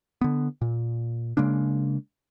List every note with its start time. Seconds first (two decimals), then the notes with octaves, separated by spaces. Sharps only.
0.21 D3 B3
0.61 A#2
1.37 C#3 G#3 A#3 D4